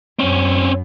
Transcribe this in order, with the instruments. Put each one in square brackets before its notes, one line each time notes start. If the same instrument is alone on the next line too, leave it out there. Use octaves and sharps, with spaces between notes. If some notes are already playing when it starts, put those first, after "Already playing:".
[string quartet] F#2 [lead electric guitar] C4 C#4